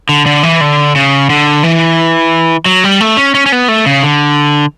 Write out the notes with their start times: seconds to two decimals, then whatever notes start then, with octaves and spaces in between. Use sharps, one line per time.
0.09 D3
0.26 D3
0.43 E3
0.61 D3
0.95 C#3
1.30 D3
1.63 E3
2.66 F#3
2.84 G3
3.01 A3
3.17 C#4
3.35 C#4
3.46 C#4
3.52 B3
3.68 A3
3.86 C#3
4.03 D3